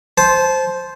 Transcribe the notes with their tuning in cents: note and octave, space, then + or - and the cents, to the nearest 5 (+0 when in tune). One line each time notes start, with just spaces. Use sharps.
C5 +0 A5 -25